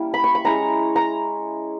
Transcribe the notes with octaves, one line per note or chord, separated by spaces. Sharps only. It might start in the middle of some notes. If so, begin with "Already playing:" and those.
Already playing: G3 A#3 C#4 E4
B5
C#6
B5
G#3 C#4 E4 A#5
A#5